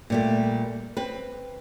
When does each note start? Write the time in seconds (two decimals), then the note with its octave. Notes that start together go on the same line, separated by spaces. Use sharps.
0.10 A#2 G3 A3
0.97 C4 B4